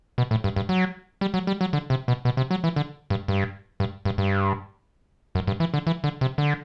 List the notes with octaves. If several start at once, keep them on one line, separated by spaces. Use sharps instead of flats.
B2
A2
G2
G2
F#3
G3
F#3
G3
F#3
D3
C3
B2
B2
C3
F#3
E3
D3
G2
G2
G2
G2
G2
F#2
G2
E3
D3
E3
D3
C3
D3